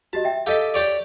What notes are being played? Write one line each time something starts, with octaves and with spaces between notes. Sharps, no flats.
F#4 G4 D#5 A5
E5 G5
G4 A4 D#5 F5 B6
G4 C#5 D5